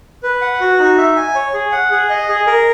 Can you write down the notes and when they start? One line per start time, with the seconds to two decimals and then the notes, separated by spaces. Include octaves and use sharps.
0.23 B4
0.41 F#5
0.60 F#4
0.79 D#4
0.97 E5
1.16 G#5
1.35 C#5
1.54 G#4
1.72 F#5
1.91 G#4
2.09 D#5
2.28 G#4
2.47 A#4